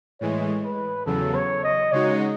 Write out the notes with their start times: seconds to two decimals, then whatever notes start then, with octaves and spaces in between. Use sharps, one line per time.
0.20 A2 E3 G#3 C#5
0.64 B4
1.06 E2 C#3 F#3 A4
1.34 C#5
1.64 D#5
1.92 C#3 G#3 D#4 F#4 C#5